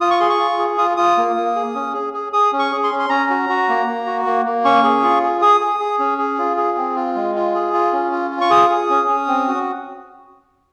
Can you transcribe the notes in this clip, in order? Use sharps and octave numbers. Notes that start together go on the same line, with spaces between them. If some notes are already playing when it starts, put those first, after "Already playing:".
F4 D#6
C#6
G#4 C6
C#6
F4
G#4
F4 D#6
F4 D#6
A#3
A#3
G#4
C#4
G#4
G#4
G#4 D#6
C#4
C#6
G#4
C6
C#4
C6
C#4 A#5
F#4
F#4
A#3
A#3
F#4
A#3
A#3
C#4 C#6
G#4
F4
G#4
G#4 D#6
G#4
G#4
C#4
G#4
F4
G#4
C4
F4
G#3
F4
G#4
F4
C#4
F4
F4
C#6
G#4 D#6
G#4
C#4
C#4
C4
F#4